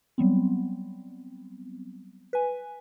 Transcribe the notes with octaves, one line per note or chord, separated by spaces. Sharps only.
F#3 G3 B3 C4
B4 G#5